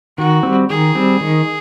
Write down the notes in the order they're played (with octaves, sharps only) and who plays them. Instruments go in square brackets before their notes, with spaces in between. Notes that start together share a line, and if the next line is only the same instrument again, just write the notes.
[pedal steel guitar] D#3 [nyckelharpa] F#4
[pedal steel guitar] G3 C4
[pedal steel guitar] D#3 [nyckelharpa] G#4
[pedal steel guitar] G3 C4
D#3